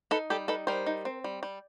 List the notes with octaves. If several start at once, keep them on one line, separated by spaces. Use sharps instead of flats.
D#4 A4 B4
G3 G4 A4
D#4 A4 B4
G3 A#4 C5
D#4
C4
G3
G3